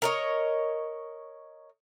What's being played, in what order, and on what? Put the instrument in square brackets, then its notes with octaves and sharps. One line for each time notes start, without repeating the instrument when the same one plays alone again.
[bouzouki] A#4 C#5 D#5